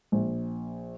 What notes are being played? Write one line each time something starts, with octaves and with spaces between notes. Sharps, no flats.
A#1